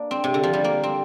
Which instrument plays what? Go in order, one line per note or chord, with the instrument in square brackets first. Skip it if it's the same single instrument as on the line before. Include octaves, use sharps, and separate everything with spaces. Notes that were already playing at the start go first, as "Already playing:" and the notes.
Already playing: [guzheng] A#3 D4
C4
C3
D3
F3
G3
A#3
C4